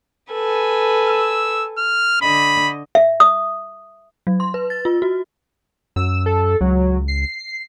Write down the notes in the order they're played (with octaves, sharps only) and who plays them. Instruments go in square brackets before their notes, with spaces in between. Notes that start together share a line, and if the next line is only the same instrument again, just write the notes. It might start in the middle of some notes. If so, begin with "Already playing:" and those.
[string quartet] A4 B4 G#5
[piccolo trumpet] E6
F6
[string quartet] D3 D#5 [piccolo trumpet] B5
[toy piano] E5
D#6
[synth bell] F#3
C6
B4
A6
F4
F#4
[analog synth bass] F#2 [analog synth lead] E6
[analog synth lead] A4
[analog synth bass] C#2 [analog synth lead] F#3
[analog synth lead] C7